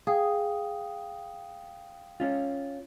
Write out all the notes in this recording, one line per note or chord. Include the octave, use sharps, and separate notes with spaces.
G#4 F5 G5 D#6
C#4 F4